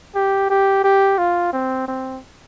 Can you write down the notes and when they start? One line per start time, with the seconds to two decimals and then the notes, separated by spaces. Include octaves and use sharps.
0.15 G4
0.50 G4
0.84 G4
1.18 F4
1.53 C4
1.88 C4